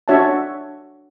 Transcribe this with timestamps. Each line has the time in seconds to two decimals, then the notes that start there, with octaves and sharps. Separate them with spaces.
0.08 D4 F#4 C#5 E5 A5